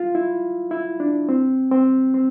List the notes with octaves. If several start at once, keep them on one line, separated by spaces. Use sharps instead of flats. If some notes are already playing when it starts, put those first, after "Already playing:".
Already playing: F4
E4
E4
D4
C4
C4
C4